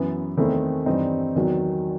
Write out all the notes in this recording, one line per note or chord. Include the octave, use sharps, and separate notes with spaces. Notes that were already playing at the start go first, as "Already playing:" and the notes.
Already playing: F#2 E3 B3 E4
E2 D#3 A3 C4 E4
G2 E3 G3 C4 D#4
E2 D#3 F#3